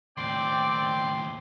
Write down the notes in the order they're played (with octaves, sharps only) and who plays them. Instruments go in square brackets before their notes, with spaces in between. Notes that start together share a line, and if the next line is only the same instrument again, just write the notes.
[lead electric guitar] D#2 A2 [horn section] C4 D5 G5 [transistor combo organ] C6